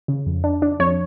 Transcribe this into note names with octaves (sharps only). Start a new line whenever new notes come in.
C#3
F2
D4
D4
F2 C#5